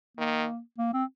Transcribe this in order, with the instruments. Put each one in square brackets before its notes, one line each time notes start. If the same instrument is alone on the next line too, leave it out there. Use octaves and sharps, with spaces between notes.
[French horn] D#3 [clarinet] A#3
[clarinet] A#3
C4